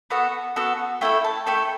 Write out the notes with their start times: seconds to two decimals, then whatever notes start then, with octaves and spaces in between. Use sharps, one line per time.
0.10 B3 F#4 A4 F#5
0.56 B3 F#4 A4
1.01 A3 E4 A4 G5
1.24 A5
1.46 A3 E4 A4 G5